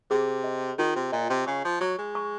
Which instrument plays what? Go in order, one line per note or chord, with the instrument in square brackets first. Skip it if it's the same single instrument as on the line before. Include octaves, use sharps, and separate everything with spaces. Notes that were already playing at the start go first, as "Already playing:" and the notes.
[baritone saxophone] C3 [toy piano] G#4
[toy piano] D#5
[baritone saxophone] D#3 [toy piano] F4
[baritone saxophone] C3
[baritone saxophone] A#2 [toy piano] D#5
[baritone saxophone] C3
[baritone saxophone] C#3 [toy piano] C#6
[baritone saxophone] F3
[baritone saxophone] F#3 [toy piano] C#6
[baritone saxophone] G#3
[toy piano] C#6